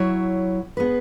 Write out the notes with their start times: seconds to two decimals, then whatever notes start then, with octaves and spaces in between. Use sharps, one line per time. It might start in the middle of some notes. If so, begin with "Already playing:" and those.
Already playing: F#3 E4 C#5
0.77 B3 G#4 B4